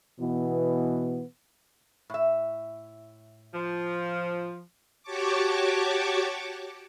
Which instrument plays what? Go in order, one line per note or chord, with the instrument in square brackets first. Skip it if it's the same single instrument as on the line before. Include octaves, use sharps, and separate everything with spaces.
[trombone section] B2 E3 B3
[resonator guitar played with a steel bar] A2 E5
[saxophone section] F3
[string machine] F#4 G4 C#5 A5 C#6 D6